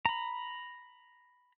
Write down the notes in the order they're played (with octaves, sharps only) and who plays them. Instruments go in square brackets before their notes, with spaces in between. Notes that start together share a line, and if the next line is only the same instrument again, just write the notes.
[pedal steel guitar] A#5 B5